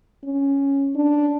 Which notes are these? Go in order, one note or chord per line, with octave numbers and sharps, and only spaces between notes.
C#4
D4